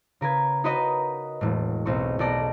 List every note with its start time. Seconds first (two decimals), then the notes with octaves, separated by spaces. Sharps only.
0.21 C#3 A#4 B4 G#6
0.64 D#4 F#4 A#4 B4 C#5 D#5
1.41 E1 A2
1.86 B1 C4 C#6
2.19 B1 A4 D5 A#6